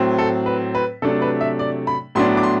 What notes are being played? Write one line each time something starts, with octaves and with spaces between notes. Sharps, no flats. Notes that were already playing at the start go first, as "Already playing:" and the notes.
Already playing: A2 F#3 C4
A4
B4
B4
C3 F#3 A3 D4 A4
B4
E5
D5
B5
A2 F#3 B3 D4 C6
D6
C6